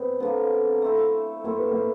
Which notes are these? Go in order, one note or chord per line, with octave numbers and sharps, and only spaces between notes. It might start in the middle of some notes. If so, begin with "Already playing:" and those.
Already playing: B3 C4
D3 F3 A#3 B3
A3 C4 E4
A3 A#3 C4 E4
B3
A#3